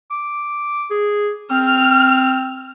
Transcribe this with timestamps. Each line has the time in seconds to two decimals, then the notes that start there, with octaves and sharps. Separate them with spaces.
0.11 D6
0.91 G#4
1.51 C4 F6